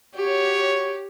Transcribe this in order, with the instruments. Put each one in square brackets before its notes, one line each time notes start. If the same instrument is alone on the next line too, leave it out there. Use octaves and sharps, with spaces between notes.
[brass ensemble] F#4 C#5 [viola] G4